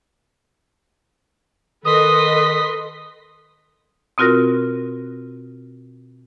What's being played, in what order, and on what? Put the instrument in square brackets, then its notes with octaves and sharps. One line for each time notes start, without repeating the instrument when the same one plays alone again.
[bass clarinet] D#3 [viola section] A4 B4 D#5 [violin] C6 B6 [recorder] D#6
[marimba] B2 C4 F4 F#4 A#4 A#6